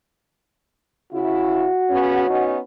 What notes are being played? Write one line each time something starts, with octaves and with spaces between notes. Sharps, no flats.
C#3 E4 F#4
C#3 B3 C#4
B3 C#4 D#4